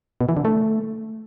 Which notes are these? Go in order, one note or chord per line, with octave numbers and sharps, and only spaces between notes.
B2
E3
D3
A3